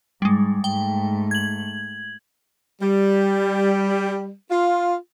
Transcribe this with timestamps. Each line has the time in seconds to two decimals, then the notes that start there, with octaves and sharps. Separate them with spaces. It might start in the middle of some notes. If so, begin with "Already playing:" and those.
0.22 G#2 G3 G#3
0.64 G#2 A3 G5
1.31 G#6 F#7
2.81 G3
4.51 F4